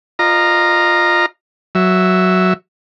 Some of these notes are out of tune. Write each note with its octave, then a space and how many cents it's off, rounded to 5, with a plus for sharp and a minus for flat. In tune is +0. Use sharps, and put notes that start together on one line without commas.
F4 +0 D#5 -30 A#5 +0
F#3 +0 E5 +0